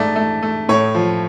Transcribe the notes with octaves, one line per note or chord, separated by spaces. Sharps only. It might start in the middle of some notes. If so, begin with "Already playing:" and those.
Already playing: G#2 A3 D5
A3
A3
A2 C#5
F3